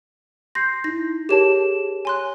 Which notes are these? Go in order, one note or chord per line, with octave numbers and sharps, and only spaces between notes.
C6 G6 A#6 C7
D#4 E4 A#6
G4 G#4 A#4 C#5 A5 E7
C#5 G#5 C6 F#6